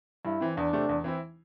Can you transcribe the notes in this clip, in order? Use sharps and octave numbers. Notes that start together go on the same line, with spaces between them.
G2 E4
E3 C4
E2 D4
C3 A3 C4
E2
E3 C4 E4